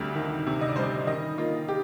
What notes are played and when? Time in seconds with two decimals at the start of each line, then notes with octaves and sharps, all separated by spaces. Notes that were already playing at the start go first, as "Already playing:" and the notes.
Already playing: D2 C3 G3
0.15 D#3
0.47 C3
0.61 D#5
0.68 D5
0.76 G3 C5
0.83 D5
1.07 D#3 D#5
1.38 A#3 F4
1.68 G4